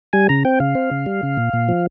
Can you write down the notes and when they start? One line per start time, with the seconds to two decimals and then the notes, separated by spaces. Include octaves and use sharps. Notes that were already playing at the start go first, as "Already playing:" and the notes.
0.13 G3 G#5
0.29 C#3 A#5
0.45 C4 G5
0.60 C#3 F5
0.75 C4
0.91 C#3
1.06 G3
1.23 C#3
1.37 A#2
1.53 A#2
1.68 F3